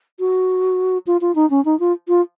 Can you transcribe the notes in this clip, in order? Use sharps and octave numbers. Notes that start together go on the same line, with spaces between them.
F#4
F4
F4
D#4
C#4
D#4
F4
F4